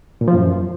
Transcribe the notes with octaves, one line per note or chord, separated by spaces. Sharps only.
A#2
F3
F#2